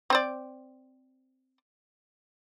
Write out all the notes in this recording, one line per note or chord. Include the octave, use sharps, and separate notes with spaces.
C4 C5 D5